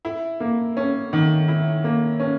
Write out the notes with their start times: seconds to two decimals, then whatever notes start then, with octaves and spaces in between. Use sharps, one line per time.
0.05 E4
0.40 A#3
0.77 C#4
1.13 D#3
1.48 E4
1.84 A#3
2.20 C#4